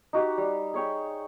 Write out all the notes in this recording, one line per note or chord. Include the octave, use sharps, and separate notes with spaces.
D#4 F#4 G4 D6
G3
G#4 C#5 G5